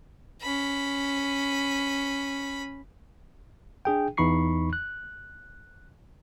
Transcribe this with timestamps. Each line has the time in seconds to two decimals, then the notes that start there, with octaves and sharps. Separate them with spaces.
0.42 C#4 B5
3.85 D4 G#4 G5
4.17 E2 E3 D#4 B5 C#6 C7
4.73 F#6